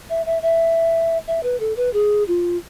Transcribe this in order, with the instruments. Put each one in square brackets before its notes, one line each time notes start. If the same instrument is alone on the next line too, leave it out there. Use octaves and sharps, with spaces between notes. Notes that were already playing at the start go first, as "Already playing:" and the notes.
[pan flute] E5
E5
E5
E5
B4
A4
B4
G#4
F4